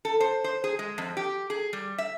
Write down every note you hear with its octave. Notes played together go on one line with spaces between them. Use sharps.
A4
C5
C5
G#4
G#3
F2
G4
G#4
G3
E5